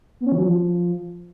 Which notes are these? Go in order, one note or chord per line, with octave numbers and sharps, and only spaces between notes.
B3
C#4
E3
F#3
F3